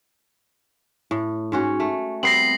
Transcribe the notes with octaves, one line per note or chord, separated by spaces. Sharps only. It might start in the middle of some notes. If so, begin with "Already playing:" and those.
A2
G#2 C#4 F#4
A3
G3 B3 C4 A#6 C7 F#7